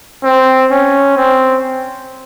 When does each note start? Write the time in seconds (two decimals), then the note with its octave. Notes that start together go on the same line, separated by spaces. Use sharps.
0.24 C4
0.71 C#4
1.17 C4